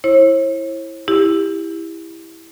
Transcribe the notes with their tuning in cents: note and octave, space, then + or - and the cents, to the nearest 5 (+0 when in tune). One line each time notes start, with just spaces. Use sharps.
E4 +0 C#5 -45
E4 +0 G4 +20